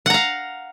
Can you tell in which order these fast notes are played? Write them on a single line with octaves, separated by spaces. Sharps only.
F#5 A#5 F5